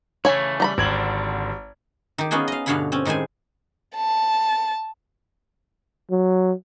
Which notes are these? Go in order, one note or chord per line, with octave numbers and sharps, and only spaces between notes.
C#3 E3 A3 C#5 G#5
G3 A#5 B5
G#1 D3 C4 G#6 F#7
D#3 G4
B3 C#4 D#4 F4 F#4 G#4
D#5 F5
G2 B2 D3 C#5 F5 B5
C4 C#4
A2 D#3 G#3 C5 G#5
A5
F#3